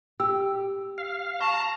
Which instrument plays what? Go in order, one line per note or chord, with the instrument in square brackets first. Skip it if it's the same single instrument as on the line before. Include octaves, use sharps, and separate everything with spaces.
[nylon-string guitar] G4 [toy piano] E6
[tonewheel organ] F5
[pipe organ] A5 [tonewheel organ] A#5 [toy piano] C#6